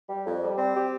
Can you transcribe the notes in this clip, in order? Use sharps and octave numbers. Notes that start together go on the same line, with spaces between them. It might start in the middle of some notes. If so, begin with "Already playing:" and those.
G3
F2
G3
C4
G4